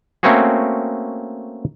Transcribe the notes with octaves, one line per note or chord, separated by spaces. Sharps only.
A3 A#3 C4 C#4 F#4 G#4